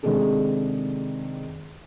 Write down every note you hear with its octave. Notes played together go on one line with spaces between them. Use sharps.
C3 D#3 G#3 D4 G#4 A4